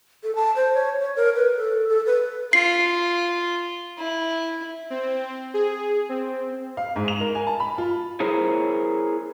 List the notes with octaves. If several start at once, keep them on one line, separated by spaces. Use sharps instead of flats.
A4
A5
C5
C#5
C#5
A#4
B4
A4
A4
B4
F4 C7
E4
C4
G#4
C4
F5
G#2
F7
A#4
G#5
A5
B5
F4
E4 G#4 A#4 C5 C#5